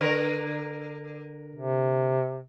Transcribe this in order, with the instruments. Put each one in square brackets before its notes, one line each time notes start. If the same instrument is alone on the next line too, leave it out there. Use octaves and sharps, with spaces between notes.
[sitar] D3 A#4 B4
[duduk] C3